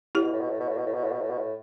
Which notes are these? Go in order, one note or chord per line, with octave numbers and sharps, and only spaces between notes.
A2 E4 G4
B2
A2
B2
A2
B2
A2
B2
A2
B2
A2
B2
A2
B2
A2